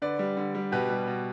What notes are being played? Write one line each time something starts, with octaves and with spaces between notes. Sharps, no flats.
D3 B4 D5
G3
D3
G3
B2 G4 B4
G3
B2